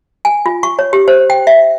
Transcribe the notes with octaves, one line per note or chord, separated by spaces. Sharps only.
G#5
F4
C#6
C#5
G4
C5
G5
E5